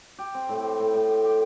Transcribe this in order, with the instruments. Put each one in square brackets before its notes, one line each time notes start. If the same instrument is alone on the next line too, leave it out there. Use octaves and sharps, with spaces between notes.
[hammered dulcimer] G4
C4
A2
C4
A2
A2
G4
G4